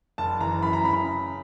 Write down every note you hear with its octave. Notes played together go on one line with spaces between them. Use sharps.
F#1 A5
E3 A#5
F#2 B5
A#5
C#3 B5